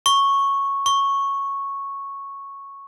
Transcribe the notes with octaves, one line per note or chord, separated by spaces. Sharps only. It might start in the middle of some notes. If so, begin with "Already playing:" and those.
C#6
C#6